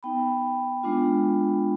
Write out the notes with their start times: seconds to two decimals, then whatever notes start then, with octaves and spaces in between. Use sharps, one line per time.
0.03 B3 D#4 G5 B5
0.83 G#3 B3 D4 F4